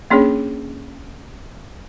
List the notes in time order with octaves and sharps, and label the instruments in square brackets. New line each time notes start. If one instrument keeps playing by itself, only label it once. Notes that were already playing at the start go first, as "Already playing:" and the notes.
[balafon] A#3 C#4 D4 G#4 C#5